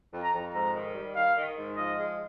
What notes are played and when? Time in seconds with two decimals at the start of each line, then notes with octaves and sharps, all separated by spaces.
0.13 F2
0.23 A#5
0.34 F2
0.53 G#2 A#5
0.74 D#3
0.95 G3
1.16 D#3 F5
1.35 D#3
1.57 G#2
1.76 F3 D#5
1.97 G#3